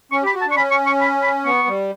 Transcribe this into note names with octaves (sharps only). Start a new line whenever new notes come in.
C#4 C#6
G4 B5
F#4
A5
D4
C#6
C#4 B5
C#6
C#6
B5
B5
B3 C#6
G3